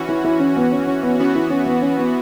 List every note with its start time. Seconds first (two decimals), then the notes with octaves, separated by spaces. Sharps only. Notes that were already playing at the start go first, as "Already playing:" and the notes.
Already playing: E3 C#4 F#4
0.09 E4
0.25 E4
0.40 C#4
0.56 B3
0.72 C#4
0.87 C#4
1.03 B3
1.19 E3 B3 C#4 F#4
1.35 E4
1.50 C#4
1.66 B3
1.82 C#4
1.98 B3